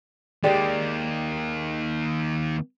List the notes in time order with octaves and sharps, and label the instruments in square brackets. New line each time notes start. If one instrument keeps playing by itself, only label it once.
[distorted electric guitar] D#3 A#3 [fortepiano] G#3 G4 D5